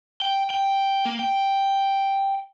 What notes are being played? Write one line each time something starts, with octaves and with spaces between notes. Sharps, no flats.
G5
G5
A#3
G5